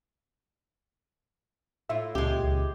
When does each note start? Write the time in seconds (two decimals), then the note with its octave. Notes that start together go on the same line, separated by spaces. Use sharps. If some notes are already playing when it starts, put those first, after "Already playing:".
1.89 A2 E4 F4 E5
2.15 C#2 A#2 G#3 G4
2.44 C#2